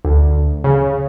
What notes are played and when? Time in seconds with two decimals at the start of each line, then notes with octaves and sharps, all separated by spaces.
0.05 D2
0.64 C#3